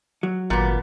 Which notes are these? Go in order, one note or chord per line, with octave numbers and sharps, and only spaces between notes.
F#3
G#1 A#2 B3